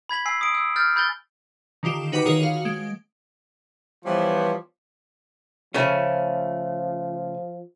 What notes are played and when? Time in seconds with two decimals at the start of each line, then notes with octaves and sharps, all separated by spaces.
0.09 B5 G#6 B6 F#7
0.26 G#5 E6 C7
0.41 D#6 D7
0.55 E6
0.76 F6 G6 A6
0.96 B5 G6 A6 G7
1.83 D3 D#3 F4 G4 E7
2.12 D#4 F#4 B4 G5 B5 D6
2.25 D#3 F4 G#4 A#4 C#5 D#6
2.42 F#4 F5
2.65 G#3 D7
4.05 E3 F3 G3 B3 C5 C#5
5.74 C#3 F3 A3 C#4